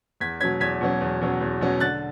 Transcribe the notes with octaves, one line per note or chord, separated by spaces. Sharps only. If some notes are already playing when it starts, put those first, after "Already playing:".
E2 G#6 B6
B2 F#3 C#4 G#6 B6
E2 G#6 B6
B2 F#3 C#4
E2
B2 F#3 C#4
E2
B2 F#3 C#4
D3 F#6 A6